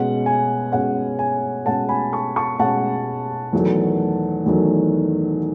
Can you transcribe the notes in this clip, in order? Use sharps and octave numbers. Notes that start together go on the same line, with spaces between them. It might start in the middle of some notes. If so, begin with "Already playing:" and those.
Already playing: B2 G#3 C#4 F#5
G#5
B2 G#3 C#4 F#5
G#5
B2 G#3 C#4 F#5 A5
G#5 B5
A5 C#6
A5 C#6
B2 G#3 C#4 F#5 A5
E2 D#3 F#3 A3
E2 D#3 F#3 A3